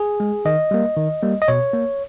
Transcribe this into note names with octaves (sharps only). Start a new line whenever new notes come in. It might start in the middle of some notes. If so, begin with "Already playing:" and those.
Already playing: G#4
G#3
D#3 D#5
G3 A#3
D#3
G3 A#3
D#5
B2 C#5
A#3